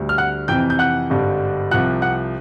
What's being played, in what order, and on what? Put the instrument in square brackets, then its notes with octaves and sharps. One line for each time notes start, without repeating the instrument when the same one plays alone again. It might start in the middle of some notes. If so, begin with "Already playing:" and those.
Already playing: [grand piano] D2 D3 G3
F6
F#5 F#6
F2 C3 E3 G5 G6
G6
F#5 F#6
G#1 G2 D3 G3
C2 C3 F3 F#5 F#6
F#5 F#6